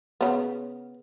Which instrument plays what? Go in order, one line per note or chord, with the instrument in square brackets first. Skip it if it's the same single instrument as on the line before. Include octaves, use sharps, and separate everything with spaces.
[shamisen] C#3 B3